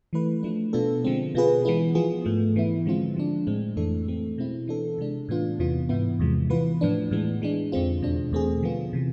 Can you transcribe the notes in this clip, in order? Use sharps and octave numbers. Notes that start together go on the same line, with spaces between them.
E3 A3 E4 B4
F3 A3 D4
B2 B3 D4 F4 A4
D3 F3 G#3 C4
B2 B3 F4 G#4 B4
E3 G#3 B3 E4
F3 B3 F4 G#4
G#2 F3 A3
E3 B3 E4
D3 F3 G#3 C4 F4
F3 G#3 D4
A2 G#3 C4
F2 E3 A3 D4 A4
E3 A3 C4
B2 G#3 C4 E4
E3 B3 D4 A4
C3 G#3 D4
A2 E3 B3 D4 F4
E2 C3 E3 B3 F4
G#2 E3 B3 E4
E2 C3 F3 G#3
E3 B3 F4 B4
A2 F3 B3 D4
A2 E3 G#3 B3
E3 G#3 D4
F2 D3 G#3 C4 F4
E2 B2 G#3 D4
E2 B2 A3 C4 G#4
D3 F3 B3 F4
C3 E3